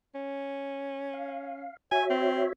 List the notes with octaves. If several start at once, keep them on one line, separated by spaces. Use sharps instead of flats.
C#4
F5
F#4 C#5 E5 G#5
C4